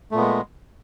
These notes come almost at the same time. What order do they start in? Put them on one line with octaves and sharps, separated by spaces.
A3 A#2 B3 G#3